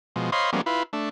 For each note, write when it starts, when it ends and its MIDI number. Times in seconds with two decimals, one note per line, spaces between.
0.16 0.30 47
0.16 0.30 53
0.16 0.30 56
0.32 0.50 72
0.32 0.50 73
0.32 0.50 75
0.32 0.50 77
0.32 0.50 83
0.32 0.50 84
0.53 0.61 53
0.53 0.61 55
0.53 0.61 56
0.53 0.61 58
0.53 0.61 59
0.53 0.61 61
0.66 0.83 64
0.66 0.83 65
0.66 0.83 71
0.93 1.09 57
0.93 1.09 62